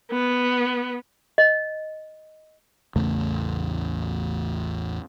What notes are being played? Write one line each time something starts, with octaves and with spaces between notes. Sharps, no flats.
B3
D#5
A1 E2 C#3 A3